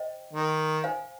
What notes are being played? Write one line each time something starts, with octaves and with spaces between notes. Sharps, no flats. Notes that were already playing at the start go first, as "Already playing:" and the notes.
Already playing: C5 D#5 G5
D#3
C5 F5 G#5